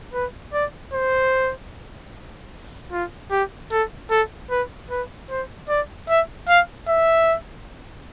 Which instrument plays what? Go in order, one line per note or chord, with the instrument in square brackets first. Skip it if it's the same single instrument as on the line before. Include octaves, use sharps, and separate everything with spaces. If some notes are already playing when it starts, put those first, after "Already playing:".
[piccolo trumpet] B4
D5
C5
F4
G4
A4
A4
B4
B4
C5
D5
E5
F5
E5